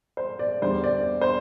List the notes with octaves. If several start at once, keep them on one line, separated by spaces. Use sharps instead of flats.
C5
D5
E2 D3 G3 C5
D5
C5